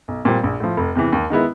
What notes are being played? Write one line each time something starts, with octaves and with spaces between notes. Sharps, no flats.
B1
A#2 G3 C4
A#1
A2 F3
F1
E2 C3 E3
D#2
D#3 G#3 B3 E4